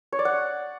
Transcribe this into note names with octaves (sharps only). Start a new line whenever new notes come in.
C#5
D5
F#5